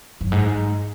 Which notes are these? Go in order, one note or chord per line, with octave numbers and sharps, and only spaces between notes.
F#2
G#2